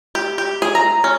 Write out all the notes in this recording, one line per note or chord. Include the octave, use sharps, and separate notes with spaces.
G4
G4
G#4
A#5
C#4